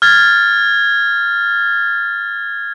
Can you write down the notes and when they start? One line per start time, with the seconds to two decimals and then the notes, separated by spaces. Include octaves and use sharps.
0.02 F6 G#6 A6